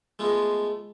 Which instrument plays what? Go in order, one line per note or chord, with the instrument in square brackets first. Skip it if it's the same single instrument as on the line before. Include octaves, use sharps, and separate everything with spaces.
[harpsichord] G#3 A3 B3 F4